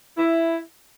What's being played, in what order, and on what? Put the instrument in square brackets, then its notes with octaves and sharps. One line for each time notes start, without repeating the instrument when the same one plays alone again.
[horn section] E4